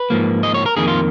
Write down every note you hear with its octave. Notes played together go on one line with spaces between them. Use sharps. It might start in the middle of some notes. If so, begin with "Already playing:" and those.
Already playing: B4
G#2 F3 A#3
D#5
C#5
A#4
F2 D#3 A#3 G#4
F4